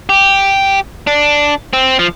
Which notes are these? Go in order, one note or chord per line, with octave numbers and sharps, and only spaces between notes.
G4
D4
C4
F3